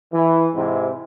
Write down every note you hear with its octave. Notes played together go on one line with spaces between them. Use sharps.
E3
G#2 C3 C4 E4